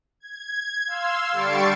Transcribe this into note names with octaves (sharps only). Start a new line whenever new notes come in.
G#6
F5 C6 E6
D3 G3 C#6 A6 C7 D7